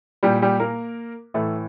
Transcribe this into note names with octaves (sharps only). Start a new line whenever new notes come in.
A#2 G3 G4
G3 G4
A#3 A#4
A2 E3 A3 A4